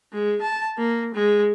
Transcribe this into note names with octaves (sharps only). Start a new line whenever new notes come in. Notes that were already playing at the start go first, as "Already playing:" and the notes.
G#3
A5
A#3
G#3